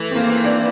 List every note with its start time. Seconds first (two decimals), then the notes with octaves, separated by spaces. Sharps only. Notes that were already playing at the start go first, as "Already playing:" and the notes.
Already playing: E3 A3
0.11 C4
0.15 A#3
0.30 C4
0.44 D4